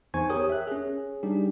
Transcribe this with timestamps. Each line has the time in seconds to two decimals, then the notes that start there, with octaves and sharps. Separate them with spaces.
0.14 E2 D#4 C5 G#5 C#6 G#6
0.29 G4 G#4 A#4 C#5 G5 D#6
0.49 E5 F#6
0.67 C#4 G#4
1.23 G3 D4 D#4 G4 G#4